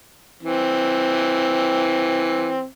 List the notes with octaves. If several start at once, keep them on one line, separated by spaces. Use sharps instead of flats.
E3 C4